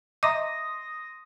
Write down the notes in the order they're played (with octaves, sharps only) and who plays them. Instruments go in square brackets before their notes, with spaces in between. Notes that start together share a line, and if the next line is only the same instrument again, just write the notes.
[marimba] D#5 E5 A#5 [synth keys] C6 D#6 A#6 [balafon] D6